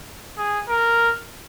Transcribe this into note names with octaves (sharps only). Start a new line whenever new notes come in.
G#4
A#4